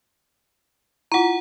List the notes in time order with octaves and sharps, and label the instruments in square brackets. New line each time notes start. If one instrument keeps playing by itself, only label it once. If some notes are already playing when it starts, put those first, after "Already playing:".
[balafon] E4 F4 [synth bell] F#5 A#5